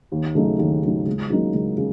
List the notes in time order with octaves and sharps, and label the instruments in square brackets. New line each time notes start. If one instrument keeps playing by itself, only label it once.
[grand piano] D#2
C#3 F#3 A3 D#4
D#2
C#3 F#3 A3 D#4
C#2
C#3 F#3 A#3 D#4
C#2
C#3